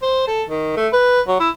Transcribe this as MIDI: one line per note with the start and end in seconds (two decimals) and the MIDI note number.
0.02 0.27 72
0.27 0.43 69
0.49 0.75 51
0.76 0.88 57
0.93 1.21 71
1.28 1.38 54
1.40 1.49 64